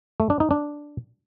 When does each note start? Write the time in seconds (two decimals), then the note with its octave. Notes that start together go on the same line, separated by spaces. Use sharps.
0.20 A3
0.30 D4
0.40 D#4
0.51 D4